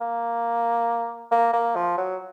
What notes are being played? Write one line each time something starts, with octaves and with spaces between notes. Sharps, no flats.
A#3
A#3
A#3
F3
F#3